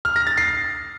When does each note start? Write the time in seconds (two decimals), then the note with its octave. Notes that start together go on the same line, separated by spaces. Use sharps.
0.05 F6
0.16 A#6
0.27 A6
0.37 C7